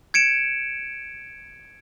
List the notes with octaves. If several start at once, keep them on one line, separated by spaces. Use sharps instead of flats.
G#6 C#7 D7 E7